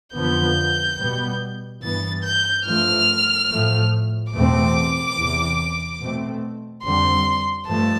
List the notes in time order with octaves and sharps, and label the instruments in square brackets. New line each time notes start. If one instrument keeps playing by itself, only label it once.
[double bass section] F2 D3 F3 B3 [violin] G6
[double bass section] B2 G3 B3
[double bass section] G2 E3 B3 [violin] A6
[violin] G6
[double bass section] G2 F3 A3 [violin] F6
[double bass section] A2 F3 A3
[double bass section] E2 B2 A3 C4 [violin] D6
[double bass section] E2 C3 E3
B2 A3 C4
[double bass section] F2 D3 G3 C4 [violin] C6
[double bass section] G2 F3 A3 [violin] A5